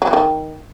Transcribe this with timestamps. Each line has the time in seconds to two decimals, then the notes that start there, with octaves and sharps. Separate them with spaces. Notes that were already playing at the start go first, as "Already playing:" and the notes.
0.02 F#3
0.07 E3
0.13 D#3